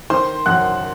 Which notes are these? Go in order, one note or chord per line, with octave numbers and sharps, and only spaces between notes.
D#3 C5 C6
F#2 F#5 F#6